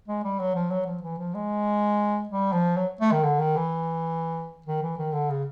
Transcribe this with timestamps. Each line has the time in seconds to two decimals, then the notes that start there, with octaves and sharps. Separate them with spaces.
0.08 G#3
0.24 G3
0.39 F#3
0.55 F3
0.71 F#3
0.86 F3
1.03 E3
1.18 F3
1.34 G#3
2.29 G3
2.53 F3
2.77 F#3
3.01 A3
3.12 D#3
3.24 D3
3.39 D#3
3.56 E3
4.66 D#3
4.82 E3
4.98 D#3
5.13 D3
5.30 C#3